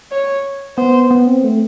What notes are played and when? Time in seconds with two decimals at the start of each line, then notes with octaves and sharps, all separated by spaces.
0.12 C#5
0.77 B3 C5
1.11 B3
1.27 C4
1.44 A3